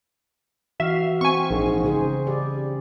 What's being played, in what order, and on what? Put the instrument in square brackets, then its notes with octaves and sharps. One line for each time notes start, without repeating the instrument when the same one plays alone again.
[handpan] E3 F5 [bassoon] F#4 [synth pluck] E5
[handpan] C4 [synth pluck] G#5 C#6
[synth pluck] A#1 [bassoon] G#2
[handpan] C#3 G#4 C5
[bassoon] G3 [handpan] D5